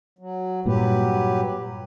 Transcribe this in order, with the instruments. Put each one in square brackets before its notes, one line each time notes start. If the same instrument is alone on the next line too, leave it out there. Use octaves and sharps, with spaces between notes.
[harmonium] F#3
[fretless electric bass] G2 A#2 [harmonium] F#3 G4 B4